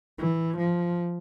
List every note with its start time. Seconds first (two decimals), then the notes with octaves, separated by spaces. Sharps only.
0.18 E3
0.57 F3